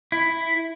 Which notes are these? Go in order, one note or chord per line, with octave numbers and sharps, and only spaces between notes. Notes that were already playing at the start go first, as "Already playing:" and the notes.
E4